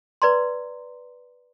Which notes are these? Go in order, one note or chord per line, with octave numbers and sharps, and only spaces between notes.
B4 D5 A#5 C6